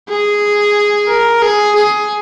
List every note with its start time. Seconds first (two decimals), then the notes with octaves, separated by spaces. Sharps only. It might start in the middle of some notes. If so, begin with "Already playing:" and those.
0.09 G#4
1.08 A#4
1.42 G#4
1.75 G#4